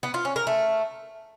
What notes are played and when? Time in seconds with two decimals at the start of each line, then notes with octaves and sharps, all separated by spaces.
0.03 B3
0.14 F4
0.25 C#4
0.36 A#4
0.47 A3